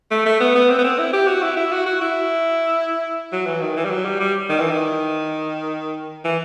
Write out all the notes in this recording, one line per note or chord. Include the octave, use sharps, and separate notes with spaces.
A3
A3
B3
B3
C4
B3
C4
E4
G4
F#4
E4
E4
F#4
F#4
E4
F#3
E3
D#3
E3
G3
F#3
G3
G3
D#3
E3
D#3
E3